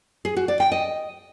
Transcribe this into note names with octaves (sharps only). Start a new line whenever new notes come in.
G#4
F#4
D5
G5
D#5